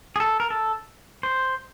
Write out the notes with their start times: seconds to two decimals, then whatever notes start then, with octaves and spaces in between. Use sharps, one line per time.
0.16 G#4
0.20 A4
0.40 A#4
0.50 A4
1.23 C5